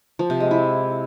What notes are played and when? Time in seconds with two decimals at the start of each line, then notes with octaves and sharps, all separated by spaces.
0.19 F3
0.30 C3
0.40 G#3
0.51 E4